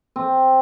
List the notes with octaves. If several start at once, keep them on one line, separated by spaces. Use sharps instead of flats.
C4